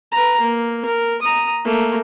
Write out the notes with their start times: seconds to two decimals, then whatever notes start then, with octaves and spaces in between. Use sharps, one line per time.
0.11 B4 A#5
0.40 A#3
0.85 A#4
1.22 A#5 D#6
1.64 A3 A#3